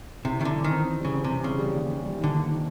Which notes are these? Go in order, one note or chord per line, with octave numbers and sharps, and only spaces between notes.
C3 E4
D#3 E4
D3
E3
D#3
C4
C4
C#3 G3
C4
C3
E3
C#3 G3
G3
D#2
D#3
G3
D#3
D3
D#2
D#3